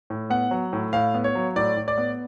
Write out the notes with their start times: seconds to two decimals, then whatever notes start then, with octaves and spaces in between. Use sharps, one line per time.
0.10 A2
0.30 B3 F#5
0.51 F#3
0.73 A2
0.93 A2 F5
1.14 B3
1.24 C#5
1.35 F#3
1.56 A2 D5
1.77 A2
1.88 D5
1.98 B3